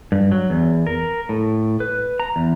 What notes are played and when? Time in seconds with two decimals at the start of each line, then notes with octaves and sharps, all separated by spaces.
0.12 G2
0.32 F#3
0.50 E2
0.87 A#4
1.29 A2
1.80 B4
2.20 A#5
2.36 E2